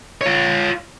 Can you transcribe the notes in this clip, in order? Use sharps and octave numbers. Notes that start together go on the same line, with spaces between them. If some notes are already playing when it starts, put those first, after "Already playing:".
F4 C#5